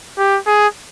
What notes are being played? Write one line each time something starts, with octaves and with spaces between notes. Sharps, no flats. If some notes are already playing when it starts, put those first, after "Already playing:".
G4
G#4